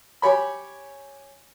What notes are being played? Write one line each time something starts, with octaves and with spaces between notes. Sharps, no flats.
G4 C#5 G#5 B5